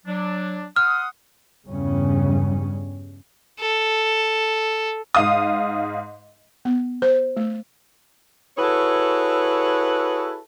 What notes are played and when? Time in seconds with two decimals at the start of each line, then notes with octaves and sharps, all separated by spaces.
0.06 F#3 D4
0.76 F#5 C6 D#6 F6
1.65 E2 G2 C#3 G3 C#4
3.60 A4
5.15 G#2 F5 D#6
6.65 B3
7.02 C5
7.37 A3
8.58 E4 F#4 G#4 A4 B4 C#5